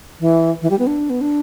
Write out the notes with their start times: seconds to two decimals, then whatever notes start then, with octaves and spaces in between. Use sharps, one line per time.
0.20 E3
0.62 E3
0.70 G3
0.79 B3
0.87 D4
1.10 B3
1.21 D4